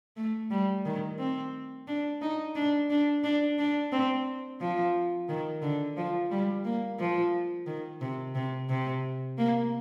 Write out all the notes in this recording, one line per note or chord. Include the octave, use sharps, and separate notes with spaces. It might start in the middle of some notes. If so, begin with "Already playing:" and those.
A3
G3
D#3
C4
D4
D#4
D4
D4
D4
D4
C4
F3
D#3
D3
F3
G3
A#3
F3
D#3
C3
C3
C3
A#3